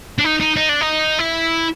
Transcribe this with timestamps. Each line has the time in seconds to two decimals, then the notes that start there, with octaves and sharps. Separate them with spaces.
0.18 D4
0.24 D#4
0.40 D#4
0.56 D#4
0.69 D4
0.81 D#4
1.19 E4